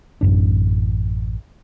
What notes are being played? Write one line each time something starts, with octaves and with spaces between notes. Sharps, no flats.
A1 F#2 D4